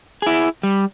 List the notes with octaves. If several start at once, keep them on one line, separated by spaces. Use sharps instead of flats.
E4 G#4
G3